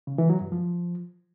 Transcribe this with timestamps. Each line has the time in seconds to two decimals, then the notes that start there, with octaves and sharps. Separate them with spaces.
0.07 C#3
0.18 E3
0.30 F#3
0.41 G2
0.52 F3